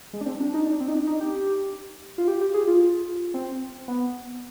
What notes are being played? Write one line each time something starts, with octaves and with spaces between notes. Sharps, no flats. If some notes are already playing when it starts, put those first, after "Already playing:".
G#3
D4
C4
D4
D#4
D4
C4
D#4
D4
D#4
G4
F4
G4
G4
G#4
F4
C4
B3